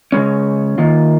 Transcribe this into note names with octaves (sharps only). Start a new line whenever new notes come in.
C#3 G#3 C#4
D#3 A#3 F4